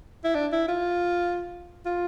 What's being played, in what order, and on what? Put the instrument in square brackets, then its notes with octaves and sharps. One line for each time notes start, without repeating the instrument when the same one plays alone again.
[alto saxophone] E4
D4
E4
F4
F4